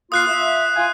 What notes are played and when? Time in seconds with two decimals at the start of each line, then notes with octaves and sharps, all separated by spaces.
0.12 A#3 F4 D#6 F#6 C7
0.29 F4 E5
0.76 F4 G#5